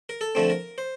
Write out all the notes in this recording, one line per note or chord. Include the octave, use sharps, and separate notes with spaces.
A#4
A4
D3 F3 A3 C4
A#4
C5